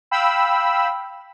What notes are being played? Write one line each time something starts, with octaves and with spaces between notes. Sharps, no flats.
F5 G5 B5 E6